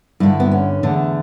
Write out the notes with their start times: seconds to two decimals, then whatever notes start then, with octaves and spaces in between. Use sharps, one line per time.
0.20 G2 D3 E4
0.40 B3
0.51 C#4
0.83 E2 D3 A3